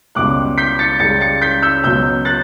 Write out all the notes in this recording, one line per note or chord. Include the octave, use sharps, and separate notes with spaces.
C#2 B2 G3 D6 F#6
G6 B6
A6 C#7
C#2 C#3 G3 A6 C#7
A6 C#7
G6 B6
E6 G6
C#2 B2 F#3 E6 G6
F#6 A6